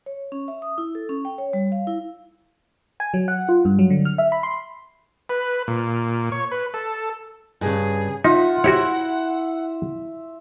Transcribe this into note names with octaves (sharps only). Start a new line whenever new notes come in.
C#5
C#4
E5
D#6
E4
A4
C#4
G5
C#5
G3
F5
E4
G#5
F#3
F#5
F4
G2
F#3
D3
F6
E5
B5
C6
B4
A#2
C#5
B4
A4
G2 C#3 G#4
D#4 F4 E5 F#5
E4 F#4 G4 C#5 E5